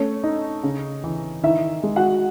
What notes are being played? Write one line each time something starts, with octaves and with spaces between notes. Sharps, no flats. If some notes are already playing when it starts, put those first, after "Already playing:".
Already playing: A3 C#4 C#5
D#4
C#3
E3
D#3 E4 E5
G#3
F#4 F#5